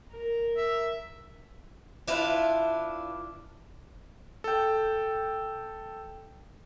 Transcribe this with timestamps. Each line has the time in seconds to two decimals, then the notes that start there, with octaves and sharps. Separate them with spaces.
0.11 A#4
0.57 E5
2.08 D4 E4 F4 B4
4.44 A4 G5